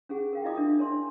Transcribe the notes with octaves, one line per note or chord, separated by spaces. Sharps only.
C#4 G4 G#4 F#5
A#4 F5 G5
E4 F4 D#5 D6 D#6
D4 A#4 E5 D#6
D4 A#4 C#5 G#5 C6